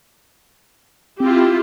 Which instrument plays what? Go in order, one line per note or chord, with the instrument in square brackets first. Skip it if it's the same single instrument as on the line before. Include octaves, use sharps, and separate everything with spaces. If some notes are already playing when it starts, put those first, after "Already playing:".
[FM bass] C4 [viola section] E4 F4 G4